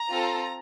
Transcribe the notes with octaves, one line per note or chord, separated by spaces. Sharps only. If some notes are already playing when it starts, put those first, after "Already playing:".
Already playing: A#5
C4 F4 A4